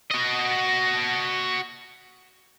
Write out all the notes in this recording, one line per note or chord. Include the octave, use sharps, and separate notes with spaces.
F#4 D#5